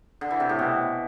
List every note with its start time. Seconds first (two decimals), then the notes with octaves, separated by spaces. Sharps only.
0.21 D3
0.31 E3
0.40 C3
0.49 A2
0.59 B2